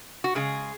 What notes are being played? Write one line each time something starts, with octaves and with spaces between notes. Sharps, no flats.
F#4
C#3 G#3 G#4